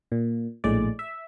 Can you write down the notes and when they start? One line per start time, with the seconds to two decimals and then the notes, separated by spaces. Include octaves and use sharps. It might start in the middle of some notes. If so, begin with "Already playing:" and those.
0.12 A#2
0.64 A#1 A2 G#3 D5
0.99 E5